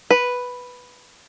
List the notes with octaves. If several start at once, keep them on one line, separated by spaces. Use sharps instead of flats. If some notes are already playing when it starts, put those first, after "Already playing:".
B4